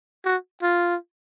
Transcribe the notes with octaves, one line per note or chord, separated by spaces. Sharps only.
F#4
F4